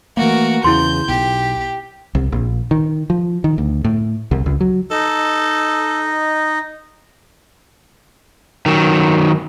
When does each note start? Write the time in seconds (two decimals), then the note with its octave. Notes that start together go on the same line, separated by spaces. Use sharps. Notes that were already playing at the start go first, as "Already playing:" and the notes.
0.17 E3 A3 A#3 F#4 A#4
0.64 E2 C#3 E4 C6 G6
1.08 B1 G4
2.15 C2
2.32 A#1
2.71 D#3
3.10 F3
3.44 D#3
3.58 D2
3.84 A2
4.31 C2
4.46 C#2
4.61 F#3
4.91 D#4 A4 D#5
8.66 D#3 F#3